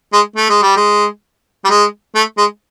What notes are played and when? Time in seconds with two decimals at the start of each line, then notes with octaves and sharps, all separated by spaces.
0.13 G#3
0.36 A3
0.50 G#3
0.62 G3
0.77 G#3
1.65 G3
1.70 G#3
2.16 A3
2.38 G#3